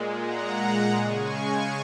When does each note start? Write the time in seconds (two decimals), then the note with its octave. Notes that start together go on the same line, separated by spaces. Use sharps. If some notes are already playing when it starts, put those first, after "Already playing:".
Already playing: A#2 G#3
0.20 F#5 A#5
1.00 C#3 G#3 G#5 C#6